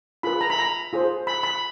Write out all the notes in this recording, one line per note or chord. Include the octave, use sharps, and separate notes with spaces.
F4 G#4 B4 B5
A#5
B5
A#5
F4 G#4 C5
B5
B5